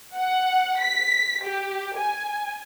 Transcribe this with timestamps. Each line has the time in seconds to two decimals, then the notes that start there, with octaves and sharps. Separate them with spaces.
0.14 F#5
0.81 B6
1.43 G4
1.96 G#5